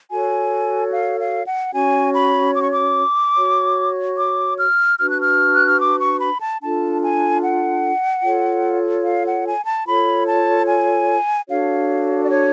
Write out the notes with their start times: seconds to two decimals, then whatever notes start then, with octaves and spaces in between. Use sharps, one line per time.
0.11 F#4 A4 C#5 G#5
0.92 F5
1.19 F5
1.46 F#5
1.74 C#4 F#4 C#5 G#5
2.14 B5
2.55 D6
2.63 C#6
2.71 D6
3.36 F#4 C#5
4.18 D6
4.59 F6
4.99 D4 F#4 B4 F6
5.10 F#6
5.21 F6
5.55 F#6
5.68 F6
5.80 D6
6.01 C#6
6.20 B5
6.41 A5
6.62 D4 F4 A4 A5
7.02 G#5
7.43 F#5
8.24 F4 A4 C#5
9.05 F5
9.26 F#5
9.46 G#5
9.66 A5
9.86 F4 A4 C#5 B5
10.27 A5
10.68 G#5
11.49 D4 F#4 A4 C#5 F5
12.23 D5
12.30 C#5